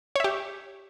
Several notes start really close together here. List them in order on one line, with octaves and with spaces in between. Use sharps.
C#5 E5 G4